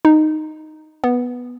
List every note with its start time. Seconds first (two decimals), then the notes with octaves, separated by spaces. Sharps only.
0.05 D#4
1.04 B3